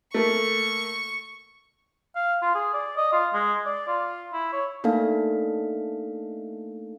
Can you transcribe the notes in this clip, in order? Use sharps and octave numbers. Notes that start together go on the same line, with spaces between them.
A3 A#3 C#6
F5
F4
G#4
D5
D#5
F4
G#3
D5
F4
E4
C#5
A3 A#3 D4 D#4 A4 F5